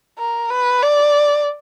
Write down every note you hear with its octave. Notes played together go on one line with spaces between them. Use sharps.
A#4
B4
D5